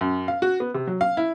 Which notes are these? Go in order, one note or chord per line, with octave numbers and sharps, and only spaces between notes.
F#2
F5
F#4
B3
C3
F#3
F5
E4